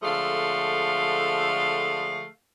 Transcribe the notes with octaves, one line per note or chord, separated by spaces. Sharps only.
D3 F3 G#3 A3 F5